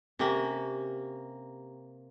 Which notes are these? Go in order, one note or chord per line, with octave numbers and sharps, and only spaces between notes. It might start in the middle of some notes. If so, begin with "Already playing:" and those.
C3 A#3 C#4 G4